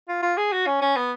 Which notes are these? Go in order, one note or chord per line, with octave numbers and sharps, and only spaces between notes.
F4
F4
G#4
F#4
C#4
C#4
B3